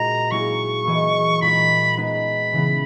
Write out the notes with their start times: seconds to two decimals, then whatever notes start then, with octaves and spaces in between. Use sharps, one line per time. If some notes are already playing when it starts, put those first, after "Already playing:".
Already playing: A#2 G#3 D#4 F#4 A#5
0.31 F#3 A#3 E4 G#4 C#6
0.84 E3 A#3 E4 G#4 D#5
1.41 A#2 G#3 D#4 G#4 B5
1.97 G#3 B3 D#4 G#4 B4 B5
2.53 C#3 E3 B3